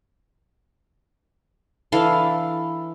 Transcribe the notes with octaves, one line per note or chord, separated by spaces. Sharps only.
E3 D4 A4 F5